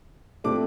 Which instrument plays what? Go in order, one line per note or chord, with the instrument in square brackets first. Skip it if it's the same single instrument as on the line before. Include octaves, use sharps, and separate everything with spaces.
[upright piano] C3 F3 A3 D4 D6